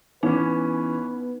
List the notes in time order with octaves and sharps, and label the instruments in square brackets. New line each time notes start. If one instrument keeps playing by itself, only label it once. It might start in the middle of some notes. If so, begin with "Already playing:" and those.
[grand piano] E3 C#4 [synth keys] B3 [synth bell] D#4 [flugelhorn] B4